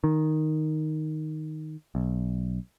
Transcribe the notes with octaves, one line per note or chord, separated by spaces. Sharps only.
D#3
B1